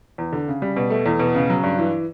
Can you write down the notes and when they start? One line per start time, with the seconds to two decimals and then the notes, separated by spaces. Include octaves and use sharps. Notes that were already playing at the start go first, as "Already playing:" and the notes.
0.18 E2
0.33 D3
0.48 C#3
0.62 G3
0.77 B2
0.90 A3
1.06 E2
1.19 B2
1.35 C#3
1.50 F#3
1.63 G2
1.78 E3